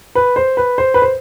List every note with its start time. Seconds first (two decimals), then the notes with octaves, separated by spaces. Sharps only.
0.15 B4
0.36 C5
0.57 B4
0.78 C5
0.94 B4
1.02 C5